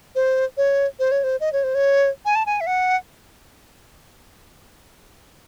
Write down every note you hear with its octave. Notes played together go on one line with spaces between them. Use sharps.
C5
C#5
C5
C#5
C5
D#5
C#5
C5
C#5
G#5
A5
G#5
E5
F#5